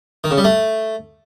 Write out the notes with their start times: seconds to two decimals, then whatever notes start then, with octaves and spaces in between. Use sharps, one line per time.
0.24 D#3
0.31 C#3
0.38 G3
0.44 A3